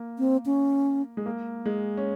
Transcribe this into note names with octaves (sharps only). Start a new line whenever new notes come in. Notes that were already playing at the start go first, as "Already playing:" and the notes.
Already playing: A#3
C4
C#4
G#3
A#3
G#3
C#4